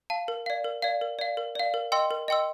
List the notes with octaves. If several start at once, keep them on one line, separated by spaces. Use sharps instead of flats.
F5 A5
A#4
D5 F5
A#4
D5 F5
A#4
D5 F5
A#4
D5 F5
A#4
D#5 G5 C6 E6
A#4
D#5 G5 C6 E6